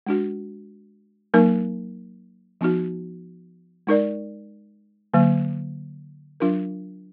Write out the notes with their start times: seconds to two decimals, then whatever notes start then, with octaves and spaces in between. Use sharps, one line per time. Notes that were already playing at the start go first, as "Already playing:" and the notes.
0.06 G#3 D4 F#4
1.34 F#3 A#3 D#4 A#4
2.61 F3 B3 D#4 F#4
3.87 G#3 D#4 A#4 D5
5.14 D3 F#3 A#3
6.40 F#3 D4 F4 A#4